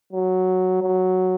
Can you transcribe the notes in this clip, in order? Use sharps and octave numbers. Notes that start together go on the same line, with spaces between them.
F#3
F#3